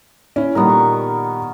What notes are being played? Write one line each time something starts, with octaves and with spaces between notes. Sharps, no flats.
C#4 E4
A#2 D#3 G3 B3 D#4 A#4
C#6